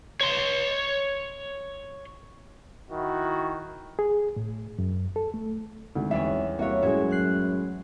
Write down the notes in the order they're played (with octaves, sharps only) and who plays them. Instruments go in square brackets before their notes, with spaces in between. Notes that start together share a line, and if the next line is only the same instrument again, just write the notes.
[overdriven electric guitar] C#5 C6
[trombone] D#3 [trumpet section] E4 F#4
[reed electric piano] G#4
A2
F#2
A4
A3
[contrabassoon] G#1 [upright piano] D2
[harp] E2 G3 C#4 [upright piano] E5
[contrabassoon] C2 [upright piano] A#3 E4 [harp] F#4 C#5
[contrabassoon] F#2 [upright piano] A2 G#3 [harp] F#3 E5 G#6
[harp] F#6 C7